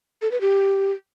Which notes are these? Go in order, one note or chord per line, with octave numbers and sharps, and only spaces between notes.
A4
B4
G4